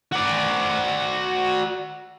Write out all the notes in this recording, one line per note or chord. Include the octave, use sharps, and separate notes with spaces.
F#4 D5